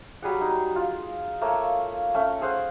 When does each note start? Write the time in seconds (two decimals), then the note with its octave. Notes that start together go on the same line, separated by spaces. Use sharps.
0.22 F#3 G3 G#4 F#5
0.41 D#4
0.76 F4
1.41 A3 A#3 C#5
2.15 A3 C#4
2.42 G#4 C5 F5 F#5